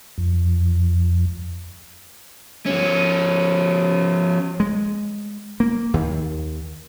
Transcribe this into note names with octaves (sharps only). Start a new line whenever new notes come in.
F2
F3 C#4
G#3
A#3
D#2